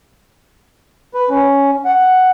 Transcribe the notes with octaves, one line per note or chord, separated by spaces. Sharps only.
B4
C#4
F#5